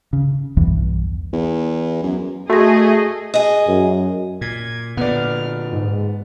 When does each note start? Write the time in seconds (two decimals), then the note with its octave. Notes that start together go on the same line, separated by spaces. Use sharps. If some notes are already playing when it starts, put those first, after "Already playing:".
0.13 C#3
0.57 B1 E2 G2 E3
1.33 E2
2.02 F#2
2.50 A3 F#4 G#4 D#5 A#6
3.34 G#4 D#5
3.68 F#2
4.41 A#2 G#6
4.97 A#2 D3 B3 D5 F6
5.72 G#2